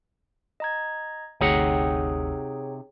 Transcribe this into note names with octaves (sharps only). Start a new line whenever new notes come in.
D#5 A#5 G#6
G1 D2 C3 D#4 G#4 C#5 F#5 G5